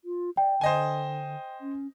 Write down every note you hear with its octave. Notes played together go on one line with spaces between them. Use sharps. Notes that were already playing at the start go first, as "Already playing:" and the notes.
F4
D5 G5
D3 C5 D#5 G#5
C#4